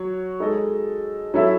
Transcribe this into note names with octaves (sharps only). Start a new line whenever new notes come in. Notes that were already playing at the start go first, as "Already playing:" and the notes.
Already playing: F#3 F#4 C#5
G#3 D#4 A4 D#5
F#3 C#4 E4 A4 E5